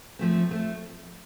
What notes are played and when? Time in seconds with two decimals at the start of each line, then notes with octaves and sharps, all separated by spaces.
0.19 F3 A3 C4
0.49 F3 A3 C4